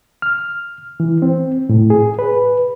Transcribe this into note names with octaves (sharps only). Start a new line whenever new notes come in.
F6
E3
C4
A2
G#4
B4